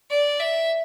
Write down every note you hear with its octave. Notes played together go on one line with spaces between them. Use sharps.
D5
E5